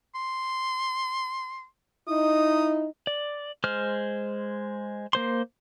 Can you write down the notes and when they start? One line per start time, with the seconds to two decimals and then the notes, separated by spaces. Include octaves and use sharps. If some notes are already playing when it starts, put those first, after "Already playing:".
0.15 C6
2.08 D#4 E4 D#6
3.07 D5
3.64 G#3 C5 F6
5.13 A#3 C5 C6